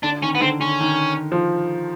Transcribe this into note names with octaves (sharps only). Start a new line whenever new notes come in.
D3 D4
D#3 C#4
B3
D3 C4
D3 C#4
D#3
F3